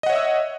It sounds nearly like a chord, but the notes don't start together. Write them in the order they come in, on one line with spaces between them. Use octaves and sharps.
D#5 F#5 C#5 E5 E6